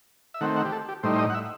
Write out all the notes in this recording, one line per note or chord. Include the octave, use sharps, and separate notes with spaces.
E5
D#3 A3 C4 F#5
F#5
G4
A4
G4
A2 G3 D#4 C5
C5
D#5
F#5
E5